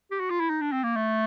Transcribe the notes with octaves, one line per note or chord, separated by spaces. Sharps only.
G4
F#4
F4
E4
D#4
D4
C4
A#3
A3